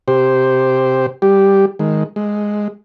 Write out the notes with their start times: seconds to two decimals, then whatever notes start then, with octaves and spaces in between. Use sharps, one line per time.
0.08 C3 G4 C5
1.22 G3 G4
1.79 D#3 G#3
2.16 G#3